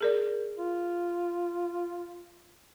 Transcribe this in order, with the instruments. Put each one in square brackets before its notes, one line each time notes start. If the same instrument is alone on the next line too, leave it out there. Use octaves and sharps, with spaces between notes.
[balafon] G#4 A#4 D5
[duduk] F4